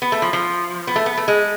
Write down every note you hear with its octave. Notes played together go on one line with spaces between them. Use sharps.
B3
A3
F3
F3
B3
A3
B3
A3
G#3